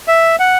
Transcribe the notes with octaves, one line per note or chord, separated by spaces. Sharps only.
E5
F#5